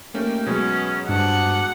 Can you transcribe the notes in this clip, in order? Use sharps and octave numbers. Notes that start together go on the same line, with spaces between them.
D#2 A3 A#3 C#4 G5
B2 F#3 G#3 B3 C#4
G2 C4 F#5 A5 D6